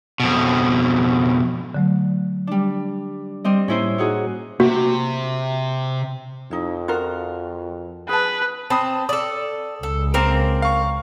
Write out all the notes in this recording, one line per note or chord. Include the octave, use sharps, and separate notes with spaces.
F2 B2
D3 F#3 A3
G3 D4
G3 C4 D#5
A2 A#3 C#4 E4 C5
D#4 F#4 G#4 C6
C3 A#3 F#4
F2 D#4 E4
F4 F#4 A#4
G#4 B4 A5
C4 A5 B5 D#6
A4 D5 D#6
C#2 A4
A#3 C4 A#4
F5 C#6